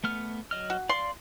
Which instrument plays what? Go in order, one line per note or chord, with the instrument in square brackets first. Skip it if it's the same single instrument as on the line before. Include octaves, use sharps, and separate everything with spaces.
[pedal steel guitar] A3 B3 F6
F#3 D#5 F6
[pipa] F#4
[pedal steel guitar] D5 F5 [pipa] C6